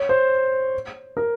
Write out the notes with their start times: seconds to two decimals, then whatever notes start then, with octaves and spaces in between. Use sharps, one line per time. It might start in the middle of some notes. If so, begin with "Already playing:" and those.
Already playing: C#5
0.09 C5
1.17 A#4